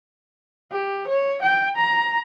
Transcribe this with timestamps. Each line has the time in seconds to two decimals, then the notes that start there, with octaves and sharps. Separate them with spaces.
0.71 G4
1.07 C#5
1.42 G5
1.76 A#5